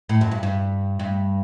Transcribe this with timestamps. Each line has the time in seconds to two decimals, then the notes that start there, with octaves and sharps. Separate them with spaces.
0.09 A2
0.21 F#2
0.31 G2
0.43 G2
0.99 G2